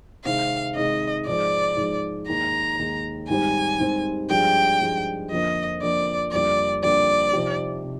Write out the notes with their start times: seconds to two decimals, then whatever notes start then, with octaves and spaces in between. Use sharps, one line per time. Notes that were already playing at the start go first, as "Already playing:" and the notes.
0.25 C3 D#3 G#3 C4 D#4 F5
0.76 C3 D#3 G#3 C4 D#4 D#5
1.26 G#2 F3 G#3 D5
1.77 G#2 F3 G#3
2.28 D#2 D#3 G#3 D#4 A#5
2.79 D#2 D#3 G#3 D#4
3.29 G#2 D#3 G3 C4 G4 G#5
3.80 G#2 D#3 G3 C4 G4
4.30 G2 F3 G#3 D4 G4 G5
4.81 G2 F3 G#3 D4 G4
5.31 F2 D3 F3 A#3 D#5
5.82 F2 D3 F3 A#3 D5
6.32 F2 D3 G3 A#3 D5
6.83 F2 D3 G3 A#3 D5
7.33 C3 F3 C4 D#4 G4
7.84 C3